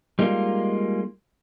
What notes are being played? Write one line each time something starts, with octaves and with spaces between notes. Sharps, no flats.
G3 G#3 A#3 D#4 F4